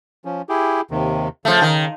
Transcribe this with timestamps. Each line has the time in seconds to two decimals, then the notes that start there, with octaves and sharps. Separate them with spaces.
0.25 F3 C#4
0.49 E4 G4 G#4
0.91 D#2 C3 D#3
1.45 C#3 F3 A3
1.62 D#3